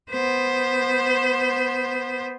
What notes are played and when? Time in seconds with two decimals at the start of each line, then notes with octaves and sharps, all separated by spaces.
0.11 B3 C5